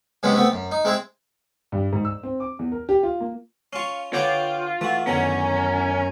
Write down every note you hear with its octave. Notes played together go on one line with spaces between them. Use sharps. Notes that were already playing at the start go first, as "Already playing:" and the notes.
C3 F#3 G#3 B3 C#4
A3 B3 C4
F#2
D#4
G#3 C4 E4 G#4
G2
G#2
E6
C4
D6
E2
A#4
G4
F4
A#3
C#4 F4 F5 C#6
D3 D4 F4 B4 C#5 G5 D6
E3 A3 F#4
F#2 B2 D3 D#3 C#4 G#5 A#5